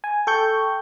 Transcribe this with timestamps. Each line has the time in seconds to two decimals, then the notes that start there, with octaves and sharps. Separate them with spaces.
0.04 G#5
0.27 A4 G5 C#6 G6